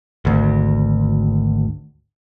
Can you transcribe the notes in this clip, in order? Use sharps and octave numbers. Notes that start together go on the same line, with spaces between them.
G#1 D2